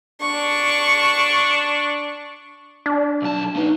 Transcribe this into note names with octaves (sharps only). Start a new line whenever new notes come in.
D4 C#6
D4
B1 A5
D#4 B4